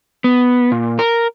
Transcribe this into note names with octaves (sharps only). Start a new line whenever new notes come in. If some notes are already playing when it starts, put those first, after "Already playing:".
B3
A#2
A#4